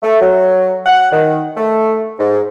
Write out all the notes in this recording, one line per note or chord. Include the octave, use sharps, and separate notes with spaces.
A3
F#3
F#5
D#3
A3
G#2